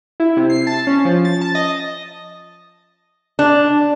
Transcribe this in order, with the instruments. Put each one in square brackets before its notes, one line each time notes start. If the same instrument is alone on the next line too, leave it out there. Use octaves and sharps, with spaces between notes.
[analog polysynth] E4
C3
C7
A5
C#4
F3
A6
A5
D#5
[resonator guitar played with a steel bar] D4